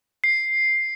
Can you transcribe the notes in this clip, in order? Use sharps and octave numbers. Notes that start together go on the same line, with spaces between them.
C7